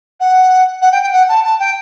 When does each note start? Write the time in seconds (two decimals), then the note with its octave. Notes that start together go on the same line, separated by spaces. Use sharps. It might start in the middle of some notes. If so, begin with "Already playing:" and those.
0.20 F#5
0.81 F#5
0.92 G5
1.03 G5
1.12 F#5
1.28 A5
1.44 A5
1.59 G5